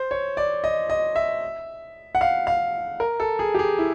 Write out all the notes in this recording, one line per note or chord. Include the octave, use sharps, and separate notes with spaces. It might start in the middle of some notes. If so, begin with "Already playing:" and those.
Already playing: C5
C#5
D5
D#5
D#5
E5
F#5
F5
F5
A#4
A4
G#4
G4
G#4
E4